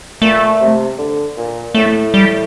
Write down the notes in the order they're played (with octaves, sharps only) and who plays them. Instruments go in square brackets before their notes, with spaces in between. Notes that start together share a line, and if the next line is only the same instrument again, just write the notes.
[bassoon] A#2 [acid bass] A3
[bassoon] C3
D3
A#2
[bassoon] A2 [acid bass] A3
[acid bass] G3